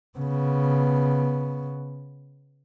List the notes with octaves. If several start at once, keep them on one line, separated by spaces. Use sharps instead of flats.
C#3 B3